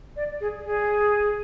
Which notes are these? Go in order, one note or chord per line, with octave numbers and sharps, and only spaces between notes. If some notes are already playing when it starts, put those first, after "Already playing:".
D5
G#4
G#4